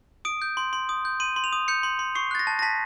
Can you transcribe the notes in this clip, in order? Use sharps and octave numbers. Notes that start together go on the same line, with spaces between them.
D#6 D7
G6
C6
C6
D#6
G6
C6 D#7
C6
F7
D#6
G6 C#7
C6
C6
C#6 C7
F#6 A6
A#6
A5
A#6
A5 B6